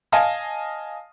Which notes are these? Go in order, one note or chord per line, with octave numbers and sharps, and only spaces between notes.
D#5 F5 G#5 A5